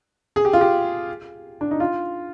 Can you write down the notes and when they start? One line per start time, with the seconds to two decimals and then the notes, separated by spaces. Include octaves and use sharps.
0.36 G#4
0.45 G4
0.53 F4
0.61 G4
1.61 D4
1.71 D#4
1.80 F4